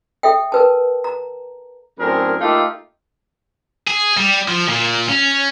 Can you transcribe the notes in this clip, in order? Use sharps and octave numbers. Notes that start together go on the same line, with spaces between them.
A4 E5 G5
A#4 B4 A5
A#5
F#2 A2 C4 D4 G#4 A#4
A3 A#3 D#4 F4 G4 A4
G#4
G3
F3
A#2
C#4